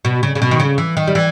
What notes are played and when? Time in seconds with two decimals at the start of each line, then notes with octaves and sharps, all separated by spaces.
0.05 B2
0.23 C#3
0.35 C#3
0.42 B2
0.51 D#3
0.60 C#3
0.78 E3
0.97 D#3
1.07 G3
1.15 E3